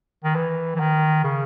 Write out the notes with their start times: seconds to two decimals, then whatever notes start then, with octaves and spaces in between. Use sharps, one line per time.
0.24 D#3
0.35 E3
0.75 E3
0.80 D#3
1.24 C#3